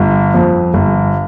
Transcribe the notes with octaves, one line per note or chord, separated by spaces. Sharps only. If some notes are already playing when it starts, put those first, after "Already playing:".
Already playing: G1
F2
G1